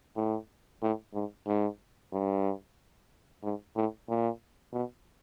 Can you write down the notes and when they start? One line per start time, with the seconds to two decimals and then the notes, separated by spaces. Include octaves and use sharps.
0.16 A2
0.82 A2
1.14 G#2
1.47 G#2
2.12 G2
3.43 G#2
3.75 A2
4.09 A#2
4.73 B2